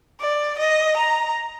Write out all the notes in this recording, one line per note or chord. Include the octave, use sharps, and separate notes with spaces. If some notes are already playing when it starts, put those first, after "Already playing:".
D5
D#5
A#5